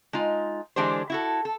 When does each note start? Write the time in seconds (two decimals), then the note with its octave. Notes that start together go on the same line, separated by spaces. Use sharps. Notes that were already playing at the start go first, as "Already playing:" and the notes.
0.13 G#3 D#4 F4
0.76 D3 E3 G#3 D4 G4 C5
1.10 E4 F#4 A4
1.45 A4